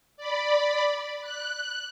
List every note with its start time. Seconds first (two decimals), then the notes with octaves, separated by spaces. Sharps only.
0.17 D5 B5
1.21 F#6